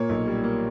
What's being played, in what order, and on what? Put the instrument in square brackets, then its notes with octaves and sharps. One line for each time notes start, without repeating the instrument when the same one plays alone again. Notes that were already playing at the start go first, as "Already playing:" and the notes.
Already playing: [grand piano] A#2 A#3 C#5
B1
G3
A#3